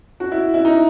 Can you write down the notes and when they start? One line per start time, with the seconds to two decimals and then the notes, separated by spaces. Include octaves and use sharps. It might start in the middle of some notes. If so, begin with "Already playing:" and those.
0.20 F#4
0.32 E4
0.54 E4
0.65 D#4